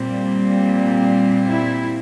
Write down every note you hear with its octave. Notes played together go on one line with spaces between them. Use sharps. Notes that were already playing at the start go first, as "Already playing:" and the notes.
Already playing: A#2 G3 C4
E4